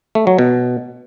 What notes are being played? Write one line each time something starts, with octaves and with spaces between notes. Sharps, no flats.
A3
F#3
B2